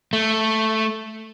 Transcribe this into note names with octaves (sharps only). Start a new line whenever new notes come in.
A3